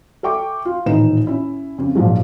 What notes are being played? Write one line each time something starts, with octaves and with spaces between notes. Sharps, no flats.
A4 E5 G5 C#6 D6
F4
D#1 A2 E3 D#4 B4 E7
C#4 E4
F2 C#3
A#1 G#2 F3 F#3 G#3